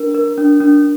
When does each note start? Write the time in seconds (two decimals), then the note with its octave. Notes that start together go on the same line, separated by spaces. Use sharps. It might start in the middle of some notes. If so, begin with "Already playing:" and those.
Already playing: D4 A#4
0.14 A#4
0.37 D4
0.60 D4